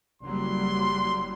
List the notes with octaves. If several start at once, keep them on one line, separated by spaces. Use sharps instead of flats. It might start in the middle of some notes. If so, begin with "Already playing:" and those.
F#1 F#3 G3 C6